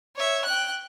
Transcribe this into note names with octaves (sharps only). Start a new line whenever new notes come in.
C#5 E5
G5 F#6